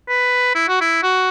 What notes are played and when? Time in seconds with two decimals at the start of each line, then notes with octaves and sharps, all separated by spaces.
0.09 B4
0.55 E4
0.68 F#4
0.81 E4
1.03 F#4